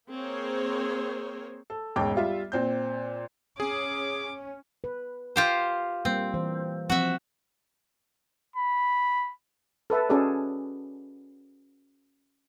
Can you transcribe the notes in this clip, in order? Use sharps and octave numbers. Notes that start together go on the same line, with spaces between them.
A#3 C4 G#4 A#4 C5 C#5
A4
E1 G#2 C#4 G5 A5 D6
G3 F4 E5
A#2 C4 G6
C#4 G#4 D6
B4
F4 G4 C5
G3 A#3 C4
E3 C5
F3 C4 F#4 E5
B5
A4 B4 E5 A5
C#4 F#4 G#4 A4 D5